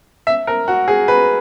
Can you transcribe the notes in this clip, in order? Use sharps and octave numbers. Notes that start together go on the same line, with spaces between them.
E5
A#4
F#4
G#4
B4